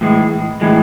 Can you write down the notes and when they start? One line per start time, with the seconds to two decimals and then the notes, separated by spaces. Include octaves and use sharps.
0.01 A2 E3 G#3
0.61 A2 E3 G#3